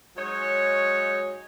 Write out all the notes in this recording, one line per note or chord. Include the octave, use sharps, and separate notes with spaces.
F#3 G#3 D#4 C#5